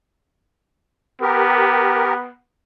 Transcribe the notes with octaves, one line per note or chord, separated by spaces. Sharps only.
B3 G4 A#4